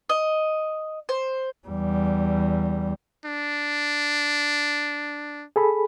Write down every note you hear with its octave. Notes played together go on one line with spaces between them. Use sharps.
D#5
C5
E2 G3
D4
G#4 A4 B5